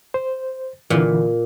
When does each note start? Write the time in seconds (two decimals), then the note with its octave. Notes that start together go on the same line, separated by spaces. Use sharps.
0.14 C5
0.90 A#2 D3 E3